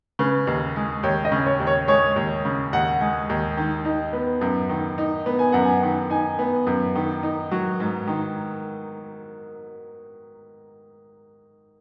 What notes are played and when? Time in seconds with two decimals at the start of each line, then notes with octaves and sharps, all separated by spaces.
0.19 C#3 B4
0.47 D#2
0.76 G#3
1.03 D#2 C#5
1.25 D#5
1.32 C#3
1.46 C#5
1.60 D#2
1.67 C#5
1.88 G#3 C#5
2.16 D#2
2.45 C#3
2.73 D#2 F#5
3.01 G#3
3.29 D#2
3.57 D#3
3.85 D#4
4.13 B3
4.41 F#2
4.69 D#3
4.98 D#4
5.26 B3
5.39 G#5
5.52 F#2 F#5
5.64 G#5
5.83 D#3
6.10 D#4 G#5
6.39 B3
6.67 F#2
6.95 D#3
7.23 D#4
7.51 F#3
7.80 G#2
8.07 D#3